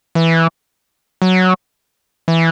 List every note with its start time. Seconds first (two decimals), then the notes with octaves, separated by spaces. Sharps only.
0.15 E3
1.22 F#3
2.28 E3